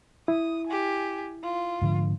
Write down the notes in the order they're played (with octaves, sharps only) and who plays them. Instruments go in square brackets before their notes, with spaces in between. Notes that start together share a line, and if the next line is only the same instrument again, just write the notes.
[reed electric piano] E4 [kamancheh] D#6
[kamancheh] G4 G#5
F4
[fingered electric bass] G#2 D3 F3